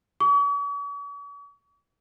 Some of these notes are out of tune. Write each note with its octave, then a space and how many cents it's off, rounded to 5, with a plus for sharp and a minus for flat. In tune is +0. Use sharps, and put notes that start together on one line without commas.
C#6 +45